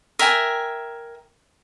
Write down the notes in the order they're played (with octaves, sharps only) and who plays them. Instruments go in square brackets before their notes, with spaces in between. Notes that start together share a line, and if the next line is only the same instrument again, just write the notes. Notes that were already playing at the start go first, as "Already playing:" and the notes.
[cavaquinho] A#4 E5 G5 G#5